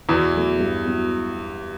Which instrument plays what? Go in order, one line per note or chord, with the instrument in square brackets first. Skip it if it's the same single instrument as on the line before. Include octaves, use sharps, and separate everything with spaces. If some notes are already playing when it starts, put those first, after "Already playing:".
[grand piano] E2 E3 [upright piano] B2
[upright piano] F#3 A3
G2
F#3 B3 E4